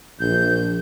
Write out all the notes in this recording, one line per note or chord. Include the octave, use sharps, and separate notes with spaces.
A#1 G6